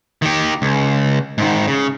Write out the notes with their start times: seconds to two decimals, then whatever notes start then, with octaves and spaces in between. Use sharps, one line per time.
0.22 D#3 G4
0.62 C#2
1.38 G#2 D#3
1.68 C#3